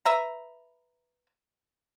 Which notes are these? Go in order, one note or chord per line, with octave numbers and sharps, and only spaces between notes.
B4 E5 A#5